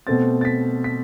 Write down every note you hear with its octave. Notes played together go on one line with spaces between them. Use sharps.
B2 A3 C4 A6
A6
B6
B6